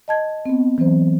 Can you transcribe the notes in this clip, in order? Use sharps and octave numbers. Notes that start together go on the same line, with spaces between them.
D#5 A5 G#6
B3 C4
E3 F#3 C4 C5